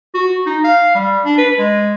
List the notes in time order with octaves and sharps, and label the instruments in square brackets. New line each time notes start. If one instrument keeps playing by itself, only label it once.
[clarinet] F#4
D#4
F5
G3
D4
B4
G#3